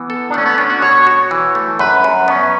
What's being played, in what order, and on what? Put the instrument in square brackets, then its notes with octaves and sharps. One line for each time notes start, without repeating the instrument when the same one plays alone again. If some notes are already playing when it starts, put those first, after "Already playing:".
Already playing: [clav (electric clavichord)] E3 [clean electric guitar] B3
[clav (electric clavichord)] A4
[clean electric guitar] D4
[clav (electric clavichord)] A3 [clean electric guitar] C#4
[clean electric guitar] B3
[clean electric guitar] C#4 [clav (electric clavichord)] D4
[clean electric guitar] F#4
[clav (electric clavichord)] B2 [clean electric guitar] C#5
[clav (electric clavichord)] F#4
E3
A3
[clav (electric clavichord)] F#2 [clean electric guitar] B4
[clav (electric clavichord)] F#2
[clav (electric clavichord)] B3 [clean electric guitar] C#4